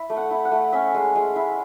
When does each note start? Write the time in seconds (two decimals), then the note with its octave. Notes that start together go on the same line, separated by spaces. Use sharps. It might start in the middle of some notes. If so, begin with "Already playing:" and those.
Already playing: E4 E5
0.10 A3
0.17 F#5
0.31 E4
0.45 F#5
0.51 A3
0.73 C#4 E5
0.94 G#3
1.15 G#3
1.36 E4